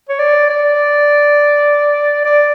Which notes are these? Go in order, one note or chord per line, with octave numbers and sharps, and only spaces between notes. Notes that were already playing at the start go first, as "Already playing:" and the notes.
C#5
D5
D5
D5